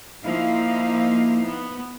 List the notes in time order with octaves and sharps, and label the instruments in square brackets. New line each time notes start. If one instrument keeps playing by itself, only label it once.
[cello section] F3 A#3 D#4 E4 F5
B3